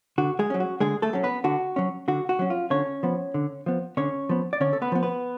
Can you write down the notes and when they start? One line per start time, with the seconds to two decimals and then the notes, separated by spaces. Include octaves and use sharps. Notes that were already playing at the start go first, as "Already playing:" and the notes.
0.18 D3 F#4
0.39 G#3 G#4
0.50 F#3 C#4
0.60 F#4
0.80 D3 G#3 G#4
1.02 A3 A4
1.13 F#3 C#4
1.23 B3 B4
1.44 D3 F#4
1.76 F#3 C#4
2.08 D3 F#4
2.29 F#4
2.39 F#3 C#4
2.50 F4
2.70 D3 C#4 C#5
3.03 F3 B3
3.34 D3
3.66 F3 B3
3.97 D3 C#4 C#5
4.29 F3 B3
4.53 D5
4.60 D3 C#4 C#5
4.73 A4
4.82 B3 B4
4.92 F3 B3
5.03 B3 B4